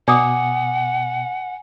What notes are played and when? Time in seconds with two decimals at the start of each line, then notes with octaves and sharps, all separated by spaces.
0.08 B2 D5 F#5 G#5 D6 D#6